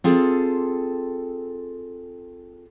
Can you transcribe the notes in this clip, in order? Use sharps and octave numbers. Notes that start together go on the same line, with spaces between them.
C4 F4 G#4 A4